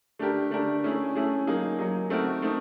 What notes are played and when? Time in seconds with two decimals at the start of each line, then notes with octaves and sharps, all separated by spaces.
0.19 A3 D4 G4 A#4
0.51 A3 D4 G4 A#4
0.84 A3 C#4 E4 G#4
1.15 A3 C#4 E4 G#4
1.47 F#3 A#3 D#4 G#4
1.79 F#3 A#3 D#4 G#4
2.10 A3 C4 D#4 F#4 A#4
2.42 A3 C4 D#4